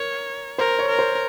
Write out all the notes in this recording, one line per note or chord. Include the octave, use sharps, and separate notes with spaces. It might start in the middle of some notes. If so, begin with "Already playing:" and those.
Already playing: A#4 C#5
A#4 C5
C#5
A#4
C5